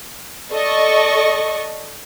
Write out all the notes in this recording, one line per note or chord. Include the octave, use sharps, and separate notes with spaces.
A4 D5 D#5 C#6